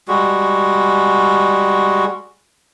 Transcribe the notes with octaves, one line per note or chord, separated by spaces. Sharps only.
G3 G#3 F#4